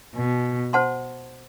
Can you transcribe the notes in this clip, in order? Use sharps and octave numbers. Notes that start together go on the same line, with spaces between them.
B2
C5 F#5 A5 C6